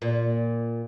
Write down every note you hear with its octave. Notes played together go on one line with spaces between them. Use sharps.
A#2